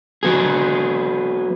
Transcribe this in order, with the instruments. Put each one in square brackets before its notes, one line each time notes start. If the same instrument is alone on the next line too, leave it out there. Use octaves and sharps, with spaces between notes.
[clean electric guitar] F#3 B3 G#4